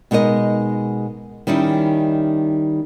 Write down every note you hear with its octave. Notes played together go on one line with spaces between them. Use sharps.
B2 G#3 D#4 A#4 D#5
D#3 G3 C#4 D#4 E4